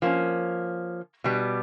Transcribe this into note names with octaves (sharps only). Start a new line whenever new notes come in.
F3 A#3 C#4
B2 G3 B3